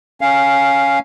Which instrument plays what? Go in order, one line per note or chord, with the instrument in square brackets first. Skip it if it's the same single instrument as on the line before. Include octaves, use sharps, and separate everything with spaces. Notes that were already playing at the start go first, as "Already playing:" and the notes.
[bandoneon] C#4 F5